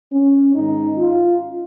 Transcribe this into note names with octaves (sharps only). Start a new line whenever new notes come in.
C#4
G#2 D#3 D#4
F4